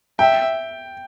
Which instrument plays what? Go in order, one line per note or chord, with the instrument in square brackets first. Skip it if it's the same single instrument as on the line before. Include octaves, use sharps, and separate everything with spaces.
[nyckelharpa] E5 [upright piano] G5